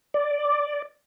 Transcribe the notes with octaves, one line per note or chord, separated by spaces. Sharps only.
D5